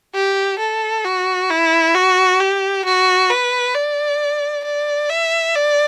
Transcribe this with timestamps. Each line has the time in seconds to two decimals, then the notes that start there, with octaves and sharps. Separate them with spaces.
0.14 G4
0.59 A4
1.05 F#4
1.50 E4
1.95 F#4
2.40 G4
2.85 F#4
3.30 B4
3.75 D5
4.64 D5
5.09 E5
5.56 D5